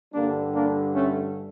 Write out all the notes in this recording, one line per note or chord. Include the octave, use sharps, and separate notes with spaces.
G2 D3 G3 A#3 D4
A#3 D4
A3 C#4